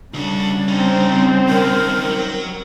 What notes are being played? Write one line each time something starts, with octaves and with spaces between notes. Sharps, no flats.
D2 C#3 G3 D4 F#4
C4 C#4 D#4
D#3 C#4 A#4
F#3